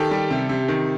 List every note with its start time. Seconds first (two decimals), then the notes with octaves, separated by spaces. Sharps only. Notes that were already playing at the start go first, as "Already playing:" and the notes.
Already playing: D#3 G4 A4
0.11 G3
0.31 C3
0.49 C3
0.68 D#3